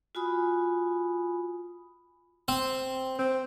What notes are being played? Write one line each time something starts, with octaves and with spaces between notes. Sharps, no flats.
F4 F#4 G#5 B5 D#6
C4
C4